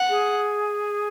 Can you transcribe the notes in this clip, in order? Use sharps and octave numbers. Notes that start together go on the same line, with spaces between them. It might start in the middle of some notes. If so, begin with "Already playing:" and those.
Already playing: F#5
G#4